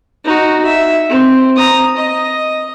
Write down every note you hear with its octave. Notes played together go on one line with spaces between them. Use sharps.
D#4 F#4
E5
C4
A#5 D#6
D#5